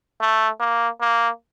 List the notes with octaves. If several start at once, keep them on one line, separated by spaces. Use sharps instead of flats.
A3
A#3
A#3